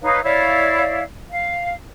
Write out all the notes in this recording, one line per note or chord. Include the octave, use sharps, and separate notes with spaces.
D#4 B4 C#5 F5
E4 C#5 D5 F5
F5